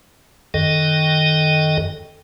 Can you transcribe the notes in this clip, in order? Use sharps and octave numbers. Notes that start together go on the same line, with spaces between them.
F#2 D#3 A4 D#5 G5